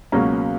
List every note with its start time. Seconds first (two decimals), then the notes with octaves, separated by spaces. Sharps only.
0.12 C#2 B2 F#3 A#3 C#4 A#5